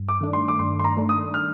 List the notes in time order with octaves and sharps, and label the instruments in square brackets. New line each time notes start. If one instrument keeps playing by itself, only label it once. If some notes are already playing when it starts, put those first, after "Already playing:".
Already playing: [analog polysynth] G2
[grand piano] D6
[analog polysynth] D#3 A3 D4
[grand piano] C6
D6
[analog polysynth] G2 [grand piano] C6
[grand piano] C6
A#5
[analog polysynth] D#3 A3 D4
[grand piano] D#6
F6